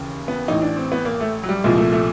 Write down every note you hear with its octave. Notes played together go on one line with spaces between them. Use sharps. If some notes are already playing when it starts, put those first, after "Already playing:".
Already playing: D#2 C#3 E3
B3
A1 A2 E3 D#4
D4
C4
B3
A#3
A3
F#3
G3
C2 A#2 F3 G#3
A3
A3